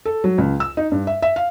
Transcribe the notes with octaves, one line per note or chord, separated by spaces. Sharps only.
A4
F#3
C#2
E6
D#4
G2
E5
E5
F5